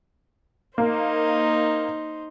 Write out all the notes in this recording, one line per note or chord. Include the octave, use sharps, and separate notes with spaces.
A#3 D#4 C5